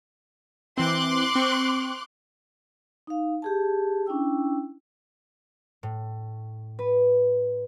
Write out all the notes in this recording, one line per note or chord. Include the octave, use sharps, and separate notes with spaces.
E3 C4 C6 D6 F#6
C4 C#6
D#4 F5
G4 G#4 A5
C#4 D4 E4 G5 E6
A2
B4